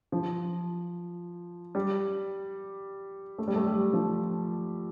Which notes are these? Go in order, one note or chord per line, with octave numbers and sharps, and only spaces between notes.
F3
G3
A3
G3
A3
G3
F3